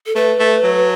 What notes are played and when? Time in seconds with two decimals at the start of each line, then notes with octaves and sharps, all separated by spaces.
0.06 A4
0.15 A3 B4
0.40 A3
0.64 F#3